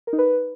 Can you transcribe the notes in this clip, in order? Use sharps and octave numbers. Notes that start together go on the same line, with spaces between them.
A#4
D#4
B4